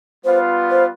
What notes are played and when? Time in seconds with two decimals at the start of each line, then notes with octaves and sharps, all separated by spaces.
0.24 G3 B3 F4 B4 C5 F5
0.70 C5